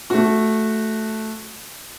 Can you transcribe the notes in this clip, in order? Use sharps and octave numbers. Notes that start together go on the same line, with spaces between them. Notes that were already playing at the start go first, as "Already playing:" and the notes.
A3 F#4